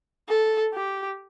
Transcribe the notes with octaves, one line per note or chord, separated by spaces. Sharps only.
A4
G4